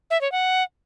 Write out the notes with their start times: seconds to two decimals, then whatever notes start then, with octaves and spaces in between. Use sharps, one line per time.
0.11 E5
0.21 C#5
0.32 F#5